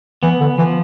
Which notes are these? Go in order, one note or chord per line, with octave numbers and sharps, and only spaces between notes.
E3 B3
D3
E3 F3